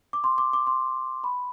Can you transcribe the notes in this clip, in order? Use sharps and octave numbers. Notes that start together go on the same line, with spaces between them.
D6
C6
D6
D6
C6
B5